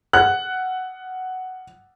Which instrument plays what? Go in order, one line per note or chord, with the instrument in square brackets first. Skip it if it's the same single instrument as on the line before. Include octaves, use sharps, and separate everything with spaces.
[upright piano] F#5 F#6